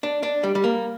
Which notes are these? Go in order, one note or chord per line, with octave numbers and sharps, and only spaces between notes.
D4
D4
G3
G3
A#3